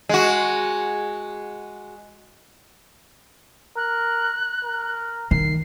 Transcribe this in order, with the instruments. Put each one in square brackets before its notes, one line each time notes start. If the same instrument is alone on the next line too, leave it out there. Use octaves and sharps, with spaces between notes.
[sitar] G#3 F#4
[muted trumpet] A#4 [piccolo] F#6
[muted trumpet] A#4
[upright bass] D#3 [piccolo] C7